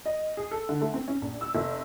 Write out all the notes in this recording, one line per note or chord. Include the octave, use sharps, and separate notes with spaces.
D#5
G#4
A4
D3
A3
C4
C#4
A#1
E6
F1